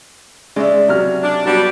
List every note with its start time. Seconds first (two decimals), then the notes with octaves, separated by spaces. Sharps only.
0.56 C#3 G#3 D5 E5
0.88 C3 F#3 F6
1.23 D4
1.46 F#3 G3 B3 D4 F#4